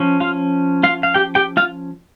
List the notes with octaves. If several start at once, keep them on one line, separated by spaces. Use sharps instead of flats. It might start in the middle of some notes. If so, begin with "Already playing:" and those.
Already playing: F3 C#4
F4 F5
F4 F5
F5
G4 G5
G4 G5
F4 F5